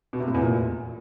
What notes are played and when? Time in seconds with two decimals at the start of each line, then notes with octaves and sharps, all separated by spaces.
0.13 B2
0.20 C3
0.27 A2
0.34 E2
0.41 A#2